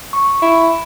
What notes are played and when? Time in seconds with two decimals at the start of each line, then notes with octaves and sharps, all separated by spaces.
0.13 C#6
0.42 E4